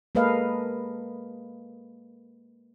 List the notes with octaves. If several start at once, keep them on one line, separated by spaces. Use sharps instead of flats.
G#3 A#3 A4 B4 D#5 F5